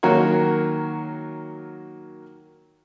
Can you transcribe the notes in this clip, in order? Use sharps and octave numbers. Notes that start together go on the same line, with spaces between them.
D#3 F#3 A#3 F#4 A#4 C#5